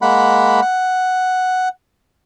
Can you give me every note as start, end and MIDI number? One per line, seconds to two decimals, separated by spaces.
0.02 0.61 56
0.02 0.61 58
0.02 0.61 78
0.02 0.61 83
0.62 1.69 78